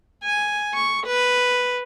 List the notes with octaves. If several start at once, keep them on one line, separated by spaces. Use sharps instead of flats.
G#5
C#6
B4